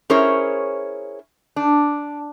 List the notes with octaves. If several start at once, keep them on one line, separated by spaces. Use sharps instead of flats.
C#4 E4 G#4 A#4 C5 C#5
D4